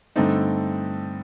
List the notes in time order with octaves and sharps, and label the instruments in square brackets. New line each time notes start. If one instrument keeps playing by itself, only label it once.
[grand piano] G2 D3 A3 C4 D#4